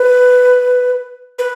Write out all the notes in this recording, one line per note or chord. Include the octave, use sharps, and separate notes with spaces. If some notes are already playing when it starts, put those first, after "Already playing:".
Already playing: B4
B4